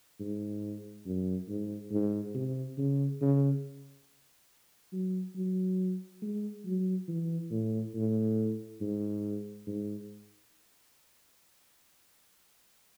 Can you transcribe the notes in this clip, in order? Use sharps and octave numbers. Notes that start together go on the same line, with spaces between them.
G#2
F#2
G#2
G#2
C3
C#3
C#3
F#3
F#3
G#3
F#3
E3
A2
A2
G#2
G#2